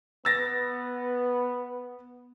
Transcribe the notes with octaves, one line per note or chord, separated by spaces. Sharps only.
B3 E6 A6 A#6